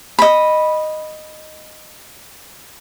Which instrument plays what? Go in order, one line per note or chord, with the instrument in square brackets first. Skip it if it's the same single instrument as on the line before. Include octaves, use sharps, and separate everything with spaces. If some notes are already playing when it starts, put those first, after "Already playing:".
[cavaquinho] D#5 B5